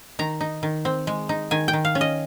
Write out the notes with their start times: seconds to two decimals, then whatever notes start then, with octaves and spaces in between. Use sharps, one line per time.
0.19 D#3 A#5
0.41 D#4
0.63 D#3
0.85 C4
1.07 G#3
1.29 D#4
1.51 D#3 G#5
1.68 G5
1.73 D#3
1.85 F5
1.95 C#4
2.01 D#5